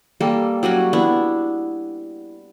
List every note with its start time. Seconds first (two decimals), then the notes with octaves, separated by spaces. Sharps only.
0.20 G3 A#3 A4
0.63 F#3 G3 C#4 F#4
0.93 B3 D4 E4